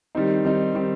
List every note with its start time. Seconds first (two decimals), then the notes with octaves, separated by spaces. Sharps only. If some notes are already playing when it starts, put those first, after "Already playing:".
0.15 D#3 G3 C4 D#4
0.45 D#3 G3 C4 D#4
0.74 D#3 G3 C4 D#4